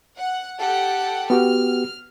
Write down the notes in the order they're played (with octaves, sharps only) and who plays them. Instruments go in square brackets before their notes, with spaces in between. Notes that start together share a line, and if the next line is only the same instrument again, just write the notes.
[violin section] F#5
G4 A4 F#5
[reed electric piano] B3 F#4 G4 [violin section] F6